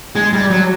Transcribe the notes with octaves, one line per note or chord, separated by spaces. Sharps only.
G#3
G3
F#3